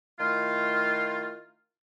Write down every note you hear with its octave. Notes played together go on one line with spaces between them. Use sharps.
D#3 A3 E4 F4